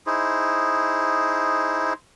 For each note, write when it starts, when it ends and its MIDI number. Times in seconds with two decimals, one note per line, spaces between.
0.07 1.93 63
0.07 1.93 64
0.07 1.93 68
0.07 1.93 72